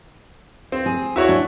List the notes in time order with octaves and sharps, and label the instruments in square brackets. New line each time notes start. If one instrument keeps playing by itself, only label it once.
[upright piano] C4
[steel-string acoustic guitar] G#4
[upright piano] E4 F#4 C#5
[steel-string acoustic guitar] D4